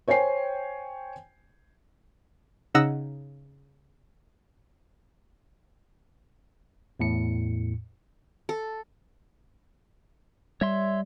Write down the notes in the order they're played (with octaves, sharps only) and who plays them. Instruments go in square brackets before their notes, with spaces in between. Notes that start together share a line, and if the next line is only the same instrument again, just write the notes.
[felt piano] C5 C#5 G5 G#5 C7
[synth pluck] C#3 D#4 D#5 F#5 E6 A#6
[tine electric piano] E2 A2 C#7
[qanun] A4
[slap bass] G3 [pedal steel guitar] C#5 E5 C6